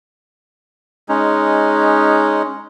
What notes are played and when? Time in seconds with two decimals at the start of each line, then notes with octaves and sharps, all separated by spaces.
1.09 G#3 C#4 D#4